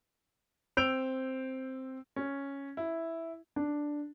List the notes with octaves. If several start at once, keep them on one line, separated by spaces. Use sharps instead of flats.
C4 E6 G6 D7 F7
C#4
E4
D4